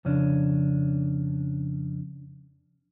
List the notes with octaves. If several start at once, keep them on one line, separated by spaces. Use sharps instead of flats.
F2 C#3 C#4 D4